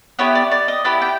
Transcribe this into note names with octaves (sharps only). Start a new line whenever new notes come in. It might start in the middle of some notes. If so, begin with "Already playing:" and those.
B3 E4 G4 C#5
D5
D5
D#5
B3 E4 G4 D5
G5